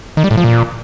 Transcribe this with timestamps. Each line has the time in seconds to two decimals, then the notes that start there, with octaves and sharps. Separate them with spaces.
0.17 D#3
0.24 G3
0.31 A2
0.38 F3
0.44 A#2